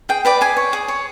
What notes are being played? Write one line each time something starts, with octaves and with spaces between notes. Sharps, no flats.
G#4 G5
B4 D5 G5
G#4 G#5
C#5
G#4
C#5